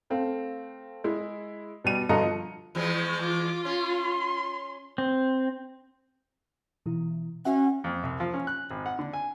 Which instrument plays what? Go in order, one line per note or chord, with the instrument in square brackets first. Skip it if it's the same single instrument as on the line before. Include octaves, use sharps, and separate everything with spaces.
[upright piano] A3 C4 F5
G#3 E4
B2 G3 D#7
G2 B2 D3 D#5 A#5 C#7
F3
[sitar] E2 F3 G#3
[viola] F4 [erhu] D6
[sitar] C#4 [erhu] C6
[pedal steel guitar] C4
[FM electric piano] B2 E3 E4
[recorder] C#4 [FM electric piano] F#4 E5 F#5
[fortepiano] F2
C2
F3
C#4
F#6
G#1
F#5
D3
G#5